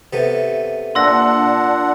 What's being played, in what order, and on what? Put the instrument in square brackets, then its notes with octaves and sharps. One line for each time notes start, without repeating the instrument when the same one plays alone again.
[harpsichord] C3 A3 B3
[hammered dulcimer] A#2 [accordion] D4 F#5 [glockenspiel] C6 E6 A#6